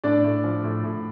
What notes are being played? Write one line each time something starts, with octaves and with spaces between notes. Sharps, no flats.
A2 D4 D5
A2
F3
A2
A2